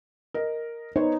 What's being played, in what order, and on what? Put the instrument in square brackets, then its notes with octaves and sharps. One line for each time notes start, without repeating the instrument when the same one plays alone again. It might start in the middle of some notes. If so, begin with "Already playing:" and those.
[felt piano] A#4 D#5
[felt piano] B3 C5 C#5 [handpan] D#4